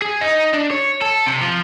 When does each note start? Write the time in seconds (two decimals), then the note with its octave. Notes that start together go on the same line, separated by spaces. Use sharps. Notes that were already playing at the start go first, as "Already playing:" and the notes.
0.02 G#4
0.21 D#4
0.53 D4
0.71 C#5
1.02 A4
1.26 C3
1.41 F3